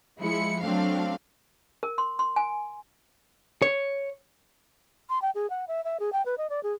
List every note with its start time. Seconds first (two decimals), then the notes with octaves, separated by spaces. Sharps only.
0.20 F3 G#3 E4 C#7
0.63 F#3 A3 C4 D4 F5
1.83 A#4
1.98 C6
2.19 C6
2.36 G#5
3.62 C#5
5.09 C6
5.22 G5
5.35 G#4
5.50 F#5
5.68 E5
5.84 E5
6.00 G#4
6.13 G5
6.25 B4
6.38 D#5
6.50 D5
6.63 G#4